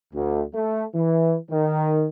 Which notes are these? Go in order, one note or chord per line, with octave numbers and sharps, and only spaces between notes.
D2
A3
E3
D#3